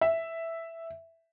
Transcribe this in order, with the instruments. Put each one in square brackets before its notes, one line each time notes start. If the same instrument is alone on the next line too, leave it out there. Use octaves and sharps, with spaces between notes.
[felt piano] E5